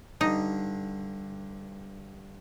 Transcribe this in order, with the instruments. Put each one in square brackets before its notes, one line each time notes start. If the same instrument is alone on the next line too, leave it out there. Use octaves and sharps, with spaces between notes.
[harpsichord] G2 D3 [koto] D#4